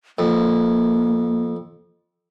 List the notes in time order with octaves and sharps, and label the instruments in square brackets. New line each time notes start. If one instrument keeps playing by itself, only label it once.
[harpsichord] F2 [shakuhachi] A#3